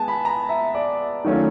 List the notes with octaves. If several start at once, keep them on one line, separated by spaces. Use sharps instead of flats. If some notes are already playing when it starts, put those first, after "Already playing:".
Already playing: G#3 B3 G#5 A5
B5
A#5
E5
D5
D#3 F#3 A3 C#4 F4